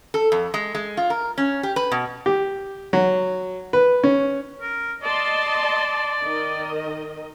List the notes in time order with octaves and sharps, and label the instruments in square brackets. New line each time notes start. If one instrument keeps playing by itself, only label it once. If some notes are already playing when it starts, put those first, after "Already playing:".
[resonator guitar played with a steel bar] A4
F2
G#3
G#3
F4
A#4
C#4
G4
B4
B2
[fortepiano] G4
F#3
B4
C#4
[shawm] A#4
[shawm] D5 [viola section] D#5 A5 C6
[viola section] D#3 D#5